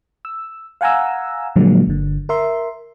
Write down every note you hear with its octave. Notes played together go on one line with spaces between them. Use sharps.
E6
F5 F#5 G#5 A#5 E6
A#2 D3 F3 F#3 G#3 A#3
G1 D3
A#4 E5 C6